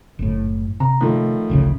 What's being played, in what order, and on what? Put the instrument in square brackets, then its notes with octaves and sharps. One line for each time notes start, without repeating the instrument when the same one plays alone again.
[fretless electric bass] F#1 A2
[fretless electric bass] C3 [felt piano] A#5
[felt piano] A2 D#3 F3
[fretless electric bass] D1 A1 C#3